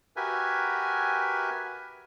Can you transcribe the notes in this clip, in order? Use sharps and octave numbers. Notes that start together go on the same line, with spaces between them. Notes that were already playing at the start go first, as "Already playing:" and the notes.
F#4 G4 A#4 B4 E5 G#5